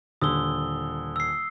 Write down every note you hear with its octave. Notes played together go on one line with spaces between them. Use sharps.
D#1 D3 D#6 E6 G7
E6 C7